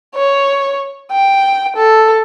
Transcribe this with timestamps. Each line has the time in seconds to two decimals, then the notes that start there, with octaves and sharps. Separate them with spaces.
0.15 C#5
1.12 G5
1.76 A4